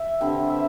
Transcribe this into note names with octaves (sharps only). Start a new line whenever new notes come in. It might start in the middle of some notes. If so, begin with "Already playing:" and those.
Already playing: E5
D3 G3 C4 G5
E5